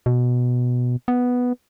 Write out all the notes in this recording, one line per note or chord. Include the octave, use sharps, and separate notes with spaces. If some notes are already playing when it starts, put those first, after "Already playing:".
B2
B3